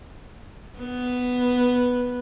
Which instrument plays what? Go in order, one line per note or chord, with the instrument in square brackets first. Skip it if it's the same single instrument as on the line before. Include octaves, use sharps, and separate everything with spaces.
[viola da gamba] B3